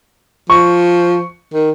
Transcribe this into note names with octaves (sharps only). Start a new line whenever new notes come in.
F3 C#6
D#3